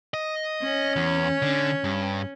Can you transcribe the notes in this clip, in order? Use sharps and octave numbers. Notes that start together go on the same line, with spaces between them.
D#5
C#4
E2
D3
G2